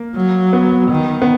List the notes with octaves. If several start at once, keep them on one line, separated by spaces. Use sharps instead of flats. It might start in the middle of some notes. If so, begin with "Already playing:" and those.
Already playing: A#3
F#3
B3
D#3
B3